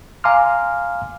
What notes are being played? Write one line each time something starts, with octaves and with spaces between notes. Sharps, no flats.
F5 G#5 A#5 C6 D6 F6